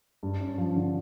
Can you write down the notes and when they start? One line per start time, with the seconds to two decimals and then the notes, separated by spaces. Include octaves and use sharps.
0.23 G2
0.40 C#4
0.58 F3
0.76 D3